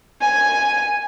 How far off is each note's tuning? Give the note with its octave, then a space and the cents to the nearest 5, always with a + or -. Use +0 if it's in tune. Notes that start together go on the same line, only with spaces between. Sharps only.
G#5 +0